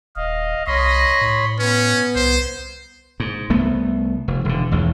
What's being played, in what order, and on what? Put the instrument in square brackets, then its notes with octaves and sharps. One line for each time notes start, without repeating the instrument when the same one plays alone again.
[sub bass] D#1 [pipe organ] D#5 F5
[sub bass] C2 [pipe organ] C#5 B5 C6 [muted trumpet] D#5
[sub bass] A2
[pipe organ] B3 [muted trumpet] C#4
[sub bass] C2 [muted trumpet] C5
[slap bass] G#2
C2 A3 B3
F1
E1 D3
E1 A1 E2 D#3